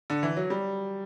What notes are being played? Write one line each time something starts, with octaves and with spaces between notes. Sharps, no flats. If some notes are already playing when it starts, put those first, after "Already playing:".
D3
E3
F#3
G3